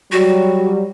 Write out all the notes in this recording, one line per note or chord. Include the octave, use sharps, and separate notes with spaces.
F#3 G3 F#4